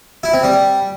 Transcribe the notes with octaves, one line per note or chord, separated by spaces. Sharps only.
E4
C4
G3